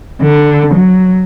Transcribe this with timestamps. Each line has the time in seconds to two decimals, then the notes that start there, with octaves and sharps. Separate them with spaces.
0.22 D3
0.74 F#3